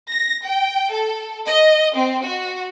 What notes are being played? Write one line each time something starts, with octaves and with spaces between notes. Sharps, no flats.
A#6
G5
A4
D#5
C4
F#4